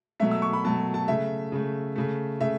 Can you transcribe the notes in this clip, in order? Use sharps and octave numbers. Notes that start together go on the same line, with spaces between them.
B2 F#3 A3 E5
E6
C#6
B5
B2 F#3 A3 A5
A5
C#3 A3 E5
C#3 A3
C#3 A3
C#3 A3 E5